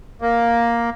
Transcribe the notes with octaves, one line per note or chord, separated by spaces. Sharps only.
A#3